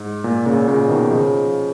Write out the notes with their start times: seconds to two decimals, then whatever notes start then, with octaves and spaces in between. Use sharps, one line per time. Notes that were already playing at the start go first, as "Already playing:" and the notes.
Already playing: G#2
0.24 A#2
0.46 A#2 C#3
0.68 A#2 C#3
0.89 B2 D#3
1.11 C#3 F3